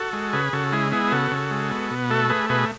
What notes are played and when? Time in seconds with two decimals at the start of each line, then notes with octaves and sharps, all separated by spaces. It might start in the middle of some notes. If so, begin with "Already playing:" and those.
Already playing: F#4 A4
0.13 G#3
0.33 C#3 G#4 B4
0.53 C#3 F#4 A4
0.72 G#3 E4 G#4
0.92 B3 E4 G#4
1.12 C#3 F#4 A4
1.32 C#3
1.51 G#3
1.71 B3
1.91 B2
2.10 A3 F#4 A4
2.29 A3 G#4 B4
2.49 B2 G#4 B4